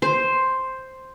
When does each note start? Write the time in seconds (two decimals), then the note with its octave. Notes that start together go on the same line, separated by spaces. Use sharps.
0.02 C5